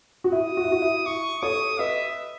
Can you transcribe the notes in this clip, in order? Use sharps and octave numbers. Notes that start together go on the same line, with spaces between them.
F#4
E4 D#6
F#4
E4
F#4
E4
E4 C#6
A4 C#5 D#6
B4 D#5 E5